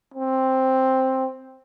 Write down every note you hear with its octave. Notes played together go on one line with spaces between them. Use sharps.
C4